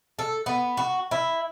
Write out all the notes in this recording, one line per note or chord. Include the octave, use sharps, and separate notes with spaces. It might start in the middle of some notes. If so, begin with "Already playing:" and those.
A4
B3
F#4
E4